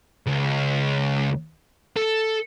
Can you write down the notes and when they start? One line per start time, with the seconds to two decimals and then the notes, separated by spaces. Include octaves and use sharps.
0.26 C#2
1.96 A4